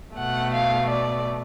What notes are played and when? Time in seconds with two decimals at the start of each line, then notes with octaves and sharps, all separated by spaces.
0.16 B2 A3 F#5
0.54 F5
0.89 D5